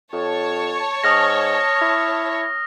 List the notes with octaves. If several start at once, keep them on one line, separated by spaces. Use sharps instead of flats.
F2 C#5 A5
G#2 D#6 F6 A#6
E4